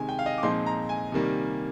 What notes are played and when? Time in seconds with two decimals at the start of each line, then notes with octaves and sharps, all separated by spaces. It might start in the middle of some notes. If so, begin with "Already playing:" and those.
Already playing: C3 D#3 G#3 G#5
0.09 G5
0.19 F5
0.26 D#5
0.38 D6
0.43 A#2 F3 G#3 C4 D#4 C6
0.66 A#5
0.89 G#5
1.12 C3 D#3 G3 A#3